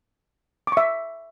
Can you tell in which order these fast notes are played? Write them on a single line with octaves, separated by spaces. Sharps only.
D6 C#6 E5